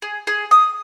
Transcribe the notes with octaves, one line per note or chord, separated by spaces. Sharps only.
G#4
G#4
D#6